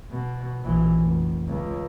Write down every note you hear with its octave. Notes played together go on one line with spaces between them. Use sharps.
B2
A#1 E3
F1
C#2